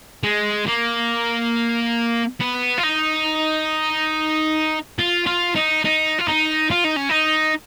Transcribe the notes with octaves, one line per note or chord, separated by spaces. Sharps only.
G#3
A#3
B3
F4
D#4
F4
F4
D#4
D#4
F4
D#4
F4
D#4
C#4
D#4